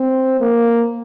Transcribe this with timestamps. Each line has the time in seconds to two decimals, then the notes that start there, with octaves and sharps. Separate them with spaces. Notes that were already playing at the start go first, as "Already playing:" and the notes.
Already playing: C4
0.40 A#3